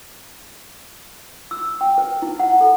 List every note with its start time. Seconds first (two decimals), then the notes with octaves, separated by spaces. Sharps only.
1.51 E6
1.81 G5
1.98 B4
2.22 E4
2.40 F#5
2.61 A4